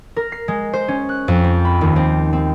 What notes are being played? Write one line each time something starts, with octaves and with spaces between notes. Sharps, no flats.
A#4
C7
G#3
C5
C#4
F#6
F2
C4
B5
D#2
C4
C4